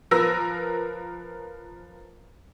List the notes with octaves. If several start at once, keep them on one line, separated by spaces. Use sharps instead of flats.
F3 A#4 B4 E6 A#6